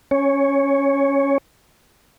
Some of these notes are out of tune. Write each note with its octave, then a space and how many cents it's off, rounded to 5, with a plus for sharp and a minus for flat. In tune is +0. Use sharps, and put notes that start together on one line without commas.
C#4 +0 C#5 +0